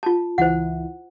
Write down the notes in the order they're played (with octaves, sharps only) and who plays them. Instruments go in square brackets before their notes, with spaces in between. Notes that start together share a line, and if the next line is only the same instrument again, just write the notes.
[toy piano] F4 A5
[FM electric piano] C#2 E3 E4 [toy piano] C5 F#5